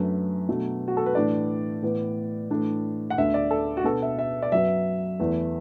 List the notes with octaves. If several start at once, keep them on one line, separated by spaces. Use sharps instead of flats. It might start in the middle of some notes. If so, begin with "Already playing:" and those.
Already playing: F#2 F#3 A3 D4 B4
B2 F#3 A3 D4
F#4
A4
B4
A2 E3 A3 D4 D5
A2 E3 B3
A2 E3 A3 D4
F#5
D2 D3 B3 D4 E5
D5
A4
F#4
B2 B3 D4 A4
E5
E5
D5
F#2 F#3 B3 E5
E2 E3 A3